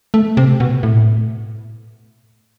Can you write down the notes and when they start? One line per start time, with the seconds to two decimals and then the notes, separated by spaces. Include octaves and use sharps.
0.14 A3
0.37 C3
0.60 B2
0.83 A2